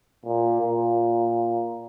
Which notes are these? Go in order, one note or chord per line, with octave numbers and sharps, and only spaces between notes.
A#2
A#2